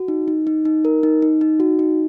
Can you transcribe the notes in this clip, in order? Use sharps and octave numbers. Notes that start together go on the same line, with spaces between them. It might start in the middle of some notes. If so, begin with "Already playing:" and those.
Already playing: F#4
D#4
D#4
D#4
D#4
A#4
D#4
D#4
D#4
F#4
D#4